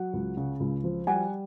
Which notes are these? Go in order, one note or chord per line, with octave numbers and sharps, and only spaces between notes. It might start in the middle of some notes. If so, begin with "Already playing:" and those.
Already playing: F#3 F#5
C#2
C#3
C#2
F3
G3 F#5 G#5